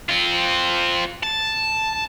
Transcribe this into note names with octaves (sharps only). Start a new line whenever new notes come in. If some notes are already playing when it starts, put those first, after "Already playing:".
C4 F4
A5